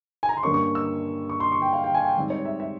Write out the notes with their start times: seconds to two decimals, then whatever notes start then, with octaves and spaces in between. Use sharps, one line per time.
0.23 G#5
0.29 A#5
0.37 C6
0.43 G2 G3 A#3 C#4 C#6
0.54 C#6
0.75 E6
1.29 C#6
1.40 C6
1.52 C#6
1.62 G5
1.73 F5
1.84 G5
1.94 G#5
2.05 G5
2.16 G#2 G3 C4
2.30 C#5
2.45 E5
2.60 E5